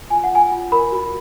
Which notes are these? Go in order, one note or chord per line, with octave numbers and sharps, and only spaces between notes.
F4 G#5
F#5
F4 G#5
F4
A#4 B5
F#4